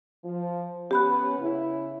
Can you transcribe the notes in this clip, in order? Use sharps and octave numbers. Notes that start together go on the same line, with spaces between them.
F3
B3 C#4 G4 B5 F#6
C#3 E4